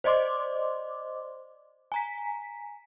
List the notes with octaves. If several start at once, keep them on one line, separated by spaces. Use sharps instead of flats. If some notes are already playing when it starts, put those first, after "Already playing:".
C5 D5 D#5 C6 D6
G#5 A#5 B6